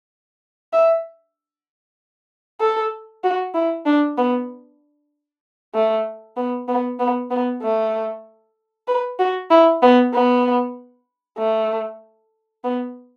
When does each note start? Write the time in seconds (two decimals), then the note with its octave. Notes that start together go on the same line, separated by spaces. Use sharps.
0.73 E5
2.61 A4
3.24 F#4
3.55 E4
3.86 D4
4.18 B3
5.75 A3
6.37 B3
6.68 B3
6.99 B3
7.31 B3
7.62 A3
8.88 B4
9.19 F#4
9.51 E4
9.82 B3
10.14 B3
11.38 A3
12.64 B3